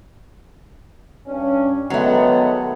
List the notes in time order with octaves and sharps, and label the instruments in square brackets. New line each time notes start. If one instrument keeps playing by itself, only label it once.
[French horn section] G2 C#4 D4
[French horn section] D#3 G#3 B3 [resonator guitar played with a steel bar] F#3 A3